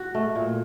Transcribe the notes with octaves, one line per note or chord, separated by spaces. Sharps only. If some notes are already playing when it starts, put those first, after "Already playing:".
Already playing: F#4
A3
A#2